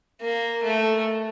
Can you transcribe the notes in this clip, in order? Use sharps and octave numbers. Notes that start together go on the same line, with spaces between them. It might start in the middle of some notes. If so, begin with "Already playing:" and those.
A#3
A3